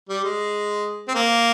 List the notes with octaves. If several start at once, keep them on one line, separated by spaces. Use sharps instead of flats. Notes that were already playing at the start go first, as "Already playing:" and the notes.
G3
G#3
C4
A#3